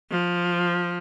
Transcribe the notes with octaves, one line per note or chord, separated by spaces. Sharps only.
F3